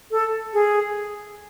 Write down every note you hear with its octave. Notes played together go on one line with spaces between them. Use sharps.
A4
G#4